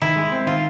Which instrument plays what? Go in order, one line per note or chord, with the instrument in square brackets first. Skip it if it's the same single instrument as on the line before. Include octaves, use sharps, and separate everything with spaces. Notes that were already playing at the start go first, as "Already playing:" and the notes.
[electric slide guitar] D#3 [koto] E4
[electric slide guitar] G#3
C4
[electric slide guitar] D#3 [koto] F4